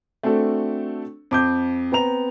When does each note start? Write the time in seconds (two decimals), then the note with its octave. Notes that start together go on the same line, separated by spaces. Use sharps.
0.23 A3 C4 D4 F#4 A4
1.31 F2 D6 G6
1.92 B3 C4 A#5 F7